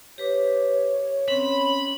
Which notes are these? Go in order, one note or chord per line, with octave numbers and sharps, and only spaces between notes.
G4 B4 C#5 D6
C4 C#4 B5